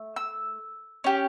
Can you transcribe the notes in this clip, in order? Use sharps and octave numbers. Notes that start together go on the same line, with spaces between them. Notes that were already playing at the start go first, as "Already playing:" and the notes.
Already playing: A3
E6
C#4 G4